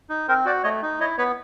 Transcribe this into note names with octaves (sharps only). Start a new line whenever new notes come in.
D#4
C4 A#4 C5
F#4 C5 D5
A3 C#5 D#5
D#4
E4 C#5 D#5
B3 B4 C#5